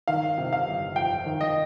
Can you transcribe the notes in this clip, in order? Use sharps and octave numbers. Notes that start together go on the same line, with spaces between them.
D#3 F5
C3
F5
G1
F2 G5
D#3
D#5